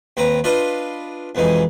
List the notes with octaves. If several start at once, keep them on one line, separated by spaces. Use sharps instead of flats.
D#2 C4 B4 A#5
D4 F4 B4 D#5 F5 C6
B1 F2 E3 G#3 D#4